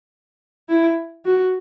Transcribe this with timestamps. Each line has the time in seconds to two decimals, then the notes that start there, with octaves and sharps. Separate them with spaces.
0.69 E4
1.25 F#4